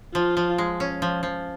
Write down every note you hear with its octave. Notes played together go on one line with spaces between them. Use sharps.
F3 F4
F3
G#3
C#4
F3
F3